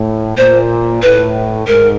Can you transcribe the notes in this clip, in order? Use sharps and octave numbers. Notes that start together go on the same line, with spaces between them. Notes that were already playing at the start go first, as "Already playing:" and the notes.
Already playing: A2
A#2 C5
A2 B4
G#2 A#4